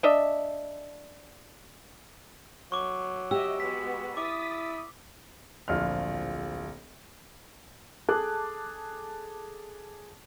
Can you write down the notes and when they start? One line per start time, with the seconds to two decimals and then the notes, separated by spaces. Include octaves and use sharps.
0.03 D4 D#5 E5
2.72 F#3 C#6 D6
3.31 G4 D#5 E5 E6
3.60 G#3 B3 F#4 B6
4.17 E4 D6 D#6 A6 B6
5.68 D1 A#1 F4 F6
8.09 G#4 A4 A5 D6 F#6